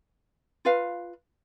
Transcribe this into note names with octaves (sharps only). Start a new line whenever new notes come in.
F4 B4 F5